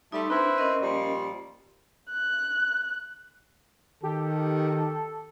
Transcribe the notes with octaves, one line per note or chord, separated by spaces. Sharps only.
G3 A3 D#4 A5 C6
C4 D4 E4 B4
C#4 A#4 D#5
A#2 F3 G3
F#6
D#3 G4 A4